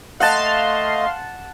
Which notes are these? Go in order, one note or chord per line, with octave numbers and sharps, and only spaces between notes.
A3 D#5 F5 F#5 A5 C6